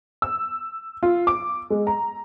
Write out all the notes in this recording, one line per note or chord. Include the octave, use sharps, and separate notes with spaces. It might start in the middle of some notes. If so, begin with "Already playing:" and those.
E6
F4
D6
G#3
A#5